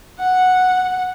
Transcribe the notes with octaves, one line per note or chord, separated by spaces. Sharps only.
F#5